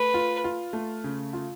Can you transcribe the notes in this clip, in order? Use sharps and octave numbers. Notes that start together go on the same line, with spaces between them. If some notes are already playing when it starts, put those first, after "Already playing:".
Already playing: A3 B4
F4
F4
A3
C#3
F4